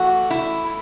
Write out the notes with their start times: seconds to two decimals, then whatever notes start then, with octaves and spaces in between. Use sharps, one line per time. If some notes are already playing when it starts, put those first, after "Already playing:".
Already playing: E3 A3 F#4
0.30 E4